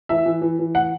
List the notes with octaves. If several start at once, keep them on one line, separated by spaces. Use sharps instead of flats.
E3 E5
E3
E3
E3
F#5